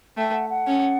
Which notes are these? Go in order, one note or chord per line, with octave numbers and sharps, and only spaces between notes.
A3 G5
F#5
F#5
C#4